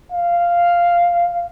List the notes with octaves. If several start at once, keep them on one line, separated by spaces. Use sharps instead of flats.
F5